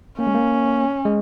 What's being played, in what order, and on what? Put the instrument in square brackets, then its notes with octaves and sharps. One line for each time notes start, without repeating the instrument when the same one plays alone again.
[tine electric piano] A#3 [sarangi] C#4
[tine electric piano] G#3
A#3
G#3